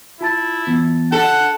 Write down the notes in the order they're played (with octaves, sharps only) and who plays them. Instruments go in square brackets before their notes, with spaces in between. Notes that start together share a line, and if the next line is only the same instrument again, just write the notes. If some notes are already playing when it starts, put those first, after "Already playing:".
[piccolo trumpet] E4 [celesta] F4 A5 A6
[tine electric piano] E3 B3
[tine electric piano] D4 [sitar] A4 [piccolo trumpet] F#5